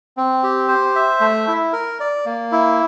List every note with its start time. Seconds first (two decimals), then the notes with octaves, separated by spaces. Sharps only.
0.17 C4
0.43 G4
0.68 C5
0.95 E5
1.20 A3
1.47 E4
1.73 A#4
2.00 D5
2.26 A#3
2.52 E4